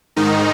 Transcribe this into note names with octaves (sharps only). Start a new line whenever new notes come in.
G#2 D#3 D#4